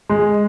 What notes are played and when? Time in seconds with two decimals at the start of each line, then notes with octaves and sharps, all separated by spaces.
0.10 G#3